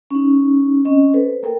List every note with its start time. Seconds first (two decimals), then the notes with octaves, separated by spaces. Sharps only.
0.11 C#4 D#4
0.85 C4 C#4 D#5
1.14 A4 B4 C5
1.43 A#3 A4 A#4 G5